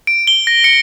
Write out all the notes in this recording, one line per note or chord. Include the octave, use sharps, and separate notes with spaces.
D7
G7
A#6
C#7